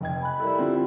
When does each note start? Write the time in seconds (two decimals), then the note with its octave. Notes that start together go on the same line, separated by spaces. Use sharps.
0.01 F1 D#5 G5 G#6
0.21 G#5 B5 F#6
0.40 G3 E4 A4 A#4
0.59 D3 C4 F4